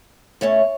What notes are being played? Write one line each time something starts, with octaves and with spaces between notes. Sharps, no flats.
A2 A3 C#4 C#5